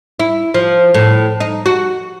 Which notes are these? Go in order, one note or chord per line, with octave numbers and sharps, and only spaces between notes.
E4
F3
A2
D#4
F#4